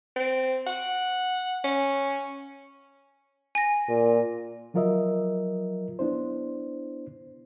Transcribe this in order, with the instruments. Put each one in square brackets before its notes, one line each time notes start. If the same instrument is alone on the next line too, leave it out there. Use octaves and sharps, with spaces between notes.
[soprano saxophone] C4
F#5
C#4
[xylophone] G#5 A#6
[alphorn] A#2
[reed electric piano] F3 F#3 F4 A#4 D#5 E5
B3 D4 E4 C5